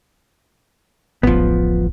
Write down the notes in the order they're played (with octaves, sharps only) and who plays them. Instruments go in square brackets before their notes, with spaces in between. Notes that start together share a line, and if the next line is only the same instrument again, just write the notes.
[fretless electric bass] D1 A1 [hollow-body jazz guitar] F3 B3